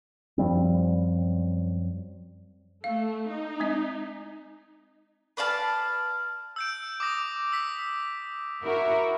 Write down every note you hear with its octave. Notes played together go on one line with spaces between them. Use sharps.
F#2 F3 G3 C4
A3 F5
D#4
G#3 C4 D#5
B4 D5 F5 A5
E6 G6 D7
D6 D#6 A#6
E6 B6
E4 F#4 A#4